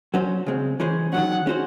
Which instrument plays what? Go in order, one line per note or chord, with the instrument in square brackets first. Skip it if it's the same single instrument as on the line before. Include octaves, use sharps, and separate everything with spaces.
[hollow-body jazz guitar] F#3 C#4 F#4 C5
C#3 G#3 C4
E3 G#3 C#4 G#4 C5
[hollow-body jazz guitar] D#3 F#3 C#4 [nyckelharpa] F#5
[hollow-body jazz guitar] G#3 C#4 F#4 C5